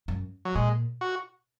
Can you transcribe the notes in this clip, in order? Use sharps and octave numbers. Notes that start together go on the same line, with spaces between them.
F#2
F#3
A#2 G#3
F#4